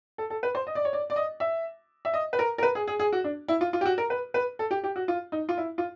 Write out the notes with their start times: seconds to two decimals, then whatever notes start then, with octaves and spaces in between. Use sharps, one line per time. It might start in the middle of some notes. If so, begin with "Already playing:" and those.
0.18 A4
0.30 A4
0.43 B4
0.55 C5
0.67 D#5
0.75 D5
0.85 C#5
0.93 D5
1.10 D5
1.16 D#5
1.40 E5
2.05 E5
2.14 D#5
2.33 B4
2.39 A#4
2.58 A#4
2.63 B4
2.75 G#4
2.88 G#4
3.00 G#4
3.13 F#4
3.24 D4
3.48 E4
3.61 F4
3.73 F4
3.81 G4
3.85 F#4
3.98 A#4
4.10 B4
4.34 B4
4.59 A4
4.71 G4
4.84 G4
4.96 F#4
5.08 F4
5.32 D#4
5.49 F4
5.58 E4
5.78 F4